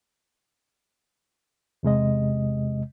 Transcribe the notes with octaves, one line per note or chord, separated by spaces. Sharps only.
E2 C3 G#3 D#5